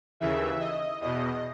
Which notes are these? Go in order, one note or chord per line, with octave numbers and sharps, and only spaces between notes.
D#2 C#3 E3 E5
D#5
E2 B2 D#5